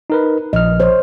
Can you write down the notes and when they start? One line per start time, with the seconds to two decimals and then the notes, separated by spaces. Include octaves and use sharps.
0.10 D#4 A#4 B4
0.53 A#1 D#5 F6
0.80 C5 C#5